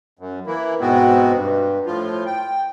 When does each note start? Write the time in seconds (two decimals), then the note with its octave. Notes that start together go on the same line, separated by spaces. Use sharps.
0.19 F#2
0.46 E3 A#3 E4
0.80 G#2 B2 G#3 B3 C4 F#4
1.33 G2
1.86 A2 F3 F4
2.26 G5